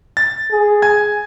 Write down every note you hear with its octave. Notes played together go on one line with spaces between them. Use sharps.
A6
G#4
G#5 G#6